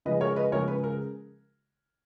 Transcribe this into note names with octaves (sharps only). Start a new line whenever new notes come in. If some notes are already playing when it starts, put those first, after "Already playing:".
C#3 F3 G#3 B4 D#5
A#4 C#5
B4 D#5
C#3 F3 G#3 A#4 C#5
B4
A#4